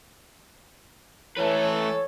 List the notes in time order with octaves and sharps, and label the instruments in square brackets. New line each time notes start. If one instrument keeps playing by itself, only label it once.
[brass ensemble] E3 A4 [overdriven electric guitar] A3 B4 [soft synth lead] C#5